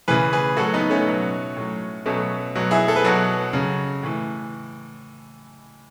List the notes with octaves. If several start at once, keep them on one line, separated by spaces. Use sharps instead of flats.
C#3 E3 G#4 B4
G#4 B4
A2 F#3 F#4 A4
B3 D#4
A3 C#4
B2 F#3
A2 F#3
B2 F#3 A3 C#4
B2 F#3
E4 G#4
A4
B4
B2 F#3 F#4 A4
C#3 F#3
A2 E3